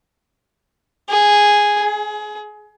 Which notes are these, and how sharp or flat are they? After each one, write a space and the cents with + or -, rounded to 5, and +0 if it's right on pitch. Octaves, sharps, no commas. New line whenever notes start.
G#4 -5
G#4 +25